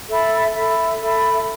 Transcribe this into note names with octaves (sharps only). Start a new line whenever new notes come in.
A4 E5 B5
A4 E5 B5
A4 E5 B5